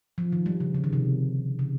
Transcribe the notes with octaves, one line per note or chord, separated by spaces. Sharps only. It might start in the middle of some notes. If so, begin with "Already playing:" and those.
F3
D#3
G3
C#3
C#3
D#3
C3
C#3